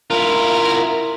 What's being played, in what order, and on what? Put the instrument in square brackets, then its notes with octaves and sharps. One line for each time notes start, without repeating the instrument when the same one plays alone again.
[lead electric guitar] E4 F4 [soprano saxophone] A#4